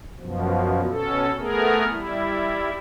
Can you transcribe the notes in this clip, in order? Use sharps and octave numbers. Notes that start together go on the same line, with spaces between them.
F#2 B2 F3
B2 C#4 A4
A3 B3 G#4 A#4
G3 E4